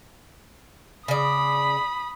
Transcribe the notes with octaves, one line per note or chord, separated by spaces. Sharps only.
C#3 D5 B5 D#6